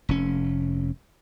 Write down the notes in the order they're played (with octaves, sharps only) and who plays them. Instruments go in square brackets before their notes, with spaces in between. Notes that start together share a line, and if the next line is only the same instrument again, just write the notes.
[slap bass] F1 C#4